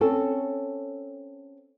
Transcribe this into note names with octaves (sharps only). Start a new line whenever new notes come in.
C4 C#4 A4